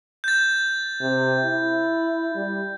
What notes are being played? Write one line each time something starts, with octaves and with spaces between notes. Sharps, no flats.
G6 A6
C3
E4
G3